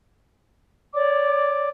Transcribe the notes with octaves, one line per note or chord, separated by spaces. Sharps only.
C#5 D5 D6